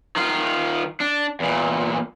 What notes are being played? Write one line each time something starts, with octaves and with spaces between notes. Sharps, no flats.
D#3 F4
D4
E2 A#2